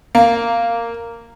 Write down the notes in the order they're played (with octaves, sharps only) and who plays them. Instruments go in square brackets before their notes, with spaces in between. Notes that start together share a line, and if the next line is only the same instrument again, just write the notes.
[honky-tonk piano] A#3